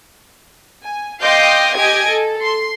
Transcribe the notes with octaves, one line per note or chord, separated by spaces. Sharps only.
G#5
D#5 F5 G5 C6 D6 G6
G4 D#5 G#5 G#6 D7
A4
C6